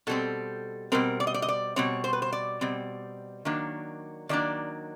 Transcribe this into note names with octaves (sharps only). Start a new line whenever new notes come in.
B2 G3 C4 A4
B2 G3 C4 A#4
D5
D#5
D5
D#5
D5
B2 G3 C4 C#5
C5
B4
C5
D5
B2 G3 C4
D#3 F#3 A#3 D4
D#3 F#3 A#3 D4 D5